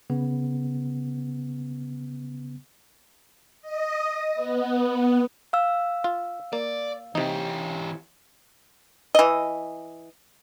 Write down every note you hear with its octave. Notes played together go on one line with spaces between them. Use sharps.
C#3 B3
D#5
B3
F5 E6
F4
A#3 D5
C3 E3 D#4 G4
E3 D#5